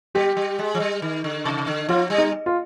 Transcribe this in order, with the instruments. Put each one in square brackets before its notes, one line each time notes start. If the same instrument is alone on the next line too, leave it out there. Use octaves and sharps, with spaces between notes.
[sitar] G3 [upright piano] G4
[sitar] G3
G#3
F3
G3
D#3
D3
C3
D3
[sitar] F3 [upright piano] F4
[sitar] G3
[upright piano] D#4
F4